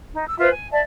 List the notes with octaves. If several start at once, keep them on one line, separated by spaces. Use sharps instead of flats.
D#4
E6
F4 B4 C5 E5
G#5
D5 E5 A5